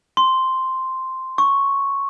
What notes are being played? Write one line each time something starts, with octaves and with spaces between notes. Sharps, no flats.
C6
C#6